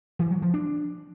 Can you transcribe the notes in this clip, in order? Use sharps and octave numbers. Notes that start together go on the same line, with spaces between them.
E3
F#3
F3
D4